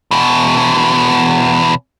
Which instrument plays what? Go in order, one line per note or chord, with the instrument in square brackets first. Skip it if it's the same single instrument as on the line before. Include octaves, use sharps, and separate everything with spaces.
[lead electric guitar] E2 B2